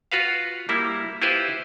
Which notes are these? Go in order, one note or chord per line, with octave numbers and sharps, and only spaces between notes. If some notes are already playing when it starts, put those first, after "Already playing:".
F4 F#4 B4 F5
G3 A#3 E4
E4 F4 G4 B4 C5